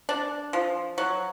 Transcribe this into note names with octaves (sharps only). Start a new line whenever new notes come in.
D4
F3
F#3